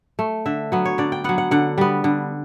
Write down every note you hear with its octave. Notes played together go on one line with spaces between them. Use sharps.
A3
D3 E5
F#3 B3
C#5
D3 D5
G5
F#3 B3 F#5
F#5
D3 F#5
G3 B3
D3